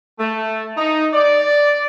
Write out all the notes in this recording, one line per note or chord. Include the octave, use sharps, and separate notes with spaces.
A3
D#4
D5